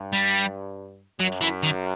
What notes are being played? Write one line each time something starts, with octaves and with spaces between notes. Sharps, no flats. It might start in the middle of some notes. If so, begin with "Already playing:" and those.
Already playing: G2
G3
F#2 F#3
E3
D#3